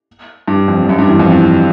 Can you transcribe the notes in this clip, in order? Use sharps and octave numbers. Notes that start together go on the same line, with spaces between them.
G2
F2
F2
F#2
G2
E2
F2
E2